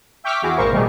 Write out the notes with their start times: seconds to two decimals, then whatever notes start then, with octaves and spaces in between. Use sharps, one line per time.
0.24 E5 G5 C#6 D6 F6 B6
0.42 E2 E4 F#4 G#4 D6
0.57 G#1 A#2 A#4 C5 F5 C#6
0.72 B2 D#3 G3 A3 G4 G#4